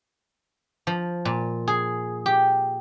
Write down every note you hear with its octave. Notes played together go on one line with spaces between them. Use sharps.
F3
A#2
G#4
G4